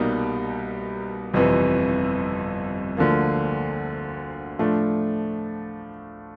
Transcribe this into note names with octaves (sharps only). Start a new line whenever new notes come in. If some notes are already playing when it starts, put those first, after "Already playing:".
Already playing: C2 B2 G3 A#3 D#4
G1 F2 C3 E3
D2 D3 F3 A#3
A2 F3 A3 D4